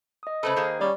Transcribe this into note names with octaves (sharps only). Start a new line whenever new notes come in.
D#5 D#6
C#3 A3 A4 B4 C5
D#3 A#3 G#4
G3 C#4 D5